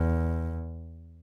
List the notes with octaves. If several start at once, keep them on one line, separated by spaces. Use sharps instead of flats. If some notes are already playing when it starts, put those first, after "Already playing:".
Already playing: E2